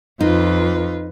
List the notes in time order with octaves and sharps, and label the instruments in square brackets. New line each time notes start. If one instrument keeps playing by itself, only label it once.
[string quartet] F2 [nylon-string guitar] D#4 [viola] F4 B4